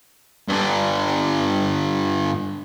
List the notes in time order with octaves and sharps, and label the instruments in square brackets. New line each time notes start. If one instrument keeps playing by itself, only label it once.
[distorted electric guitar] G2 D3